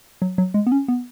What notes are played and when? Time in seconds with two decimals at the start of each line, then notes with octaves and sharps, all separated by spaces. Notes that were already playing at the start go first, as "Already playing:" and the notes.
0.22 F#3
0.38 F#3
0.54 G#3
0.67 B3
0.72 C#4
0.88 B3